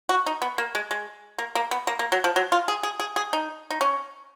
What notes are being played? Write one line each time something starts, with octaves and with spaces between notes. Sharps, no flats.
F#4
D#4
B3
A#3
G#3
G#3
A#3
A#3
B3
A#3
A#3
F#3
F3
F#3
F4
G#4
G#4
G#4
G#4
D#4
D#4
C#4